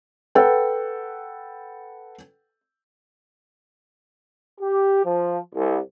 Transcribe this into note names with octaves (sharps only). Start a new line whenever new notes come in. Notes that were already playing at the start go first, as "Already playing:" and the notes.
A4 B4 F#5 G5
G4
F3
C2